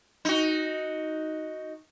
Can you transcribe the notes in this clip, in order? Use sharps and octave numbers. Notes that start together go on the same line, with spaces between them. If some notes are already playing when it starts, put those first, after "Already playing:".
D#4 F#4